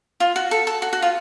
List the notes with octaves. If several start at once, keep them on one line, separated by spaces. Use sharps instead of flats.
F4
F#4
A4
A4
F#4
F#4
F4